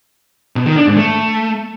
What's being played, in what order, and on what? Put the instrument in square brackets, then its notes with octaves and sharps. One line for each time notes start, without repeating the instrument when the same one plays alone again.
[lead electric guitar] B2
D#3
D4
G#2
A3